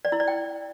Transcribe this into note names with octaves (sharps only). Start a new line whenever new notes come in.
D5
E4
D5
G5